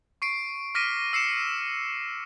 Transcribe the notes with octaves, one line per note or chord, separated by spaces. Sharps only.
C#6 C7 D7
D6 F6 A#6 B6 D7 D#7
E6 C7 C#7 E7